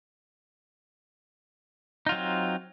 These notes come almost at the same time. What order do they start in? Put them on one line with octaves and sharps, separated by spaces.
D#4 F4 F#3 C4